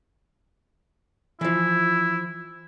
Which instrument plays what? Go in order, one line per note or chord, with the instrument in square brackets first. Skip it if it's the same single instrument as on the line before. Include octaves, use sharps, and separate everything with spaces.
[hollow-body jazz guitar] E3 F3 [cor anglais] E4